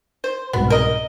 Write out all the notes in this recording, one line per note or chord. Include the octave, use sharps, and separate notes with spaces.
C5
C2 G#2 B2 B3
A#4 D#5